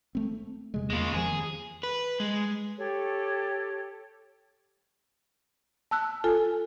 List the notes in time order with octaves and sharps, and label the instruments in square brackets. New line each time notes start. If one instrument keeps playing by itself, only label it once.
[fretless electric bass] A3 C4
F2 C3 G#3
[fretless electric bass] E2 A#3 [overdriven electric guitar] G#3 F4
[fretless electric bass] F2 D#3 F3 [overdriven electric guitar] G#4
[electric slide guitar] B4
G#3
[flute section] G4 A4 C#5
[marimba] A5 E6 F#6
F4 A4 G#5